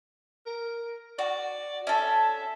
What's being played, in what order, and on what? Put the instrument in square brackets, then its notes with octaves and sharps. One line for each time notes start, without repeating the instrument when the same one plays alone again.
[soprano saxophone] A#4
[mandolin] F#4 [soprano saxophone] D5
[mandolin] C#4 A4 [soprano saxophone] E5